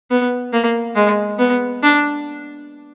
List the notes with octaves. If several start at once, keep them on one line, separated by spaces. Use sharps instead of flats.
B3
A#3
G#3
B3
D4